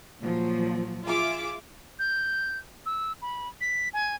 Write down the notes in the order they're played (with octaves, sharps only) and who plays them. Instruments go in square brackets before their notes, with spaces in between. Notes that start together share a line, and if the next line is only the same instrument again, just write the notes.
[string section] A#2 F3 F#3
F4 G#4 E5 D6
[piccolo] G6
E6
B5
B6
G#5